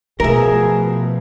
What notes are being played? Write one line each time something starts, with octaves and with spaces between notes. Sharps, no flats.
B2 F3 A3 G#4 A#4 E5